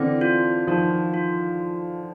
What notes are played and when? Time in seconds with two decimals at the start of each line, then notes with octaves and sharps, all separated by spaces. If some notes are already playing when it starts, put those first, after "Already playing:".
Already playing: D3 E3 C4
0.21 F4
0.67 D#3 F3 F4
1.14 F4